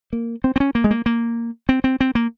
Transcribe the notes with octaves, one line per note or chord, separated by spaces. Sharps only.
A#3
C4
C4
C#4
A#3
G#3
A#3
A#3
C4
C4
C4
A#3